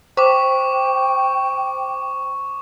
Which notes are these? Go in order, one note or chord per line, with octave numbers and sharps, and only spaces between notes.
C5 G5 C#6 D6